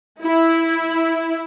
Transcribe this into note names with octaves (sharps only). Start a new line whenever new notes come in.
E4